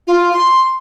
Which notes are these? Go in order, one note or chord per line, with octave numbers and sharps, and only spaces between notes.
F4
C6